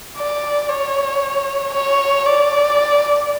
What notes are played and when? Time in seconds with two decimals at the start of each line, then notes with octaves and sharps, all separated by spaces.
0.18 D5
0.69 C#5
1.74 C#5
2.26 D5